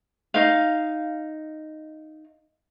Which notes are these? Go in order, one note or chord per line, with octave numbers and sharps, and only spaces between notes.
D#4 F5